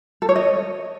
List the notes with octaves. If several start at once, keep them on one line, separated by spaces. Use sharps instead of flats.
A4
C#5
D#5